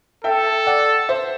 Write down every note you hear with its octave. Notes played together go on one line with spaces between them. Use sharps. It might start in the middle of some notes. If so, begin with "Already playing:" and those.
A4 E5 G5
D5 F#5
C5 E5